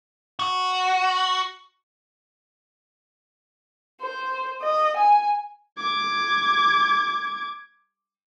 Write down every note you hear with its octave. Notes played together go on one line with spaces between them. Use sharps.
F#4
C5
D#5
G#5
D6 G#6